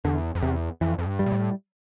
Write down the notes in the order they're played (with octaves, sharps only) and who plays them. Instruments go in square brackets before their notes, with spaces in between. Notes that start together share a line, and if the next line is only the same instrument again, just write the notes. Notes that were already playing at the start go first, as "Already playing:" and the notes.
[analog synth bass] E2 [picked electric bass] D3
[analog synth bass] F2
[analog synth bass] E2 [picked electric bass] C3
[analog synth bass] F2 [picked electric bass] E3
[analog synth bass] F2
G2
[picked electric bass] G3
[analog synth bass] A#2
A2